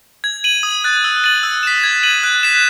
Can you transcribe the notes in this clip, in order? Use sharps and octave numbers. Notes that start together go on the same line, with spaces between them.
G#6
D#7 F#7
D#6
F#6 A6
E6
A6 D#7 F#7
E6
B6 E7
G#6
D#7 F#7
F#6
B6 E7